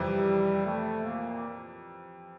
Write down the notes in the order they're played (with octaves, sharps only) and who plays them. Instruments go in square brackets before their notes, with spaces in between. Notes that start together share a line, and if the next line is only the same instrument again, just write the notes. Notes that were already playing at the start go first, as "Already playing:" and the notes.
Already playing: [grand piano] F2 C3 E3 [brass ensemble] G3
[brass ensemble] A3
A#2 A#3